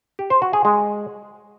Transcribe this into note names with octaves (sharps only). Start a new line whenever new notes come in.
G4
C5
F#4
G#4
G#3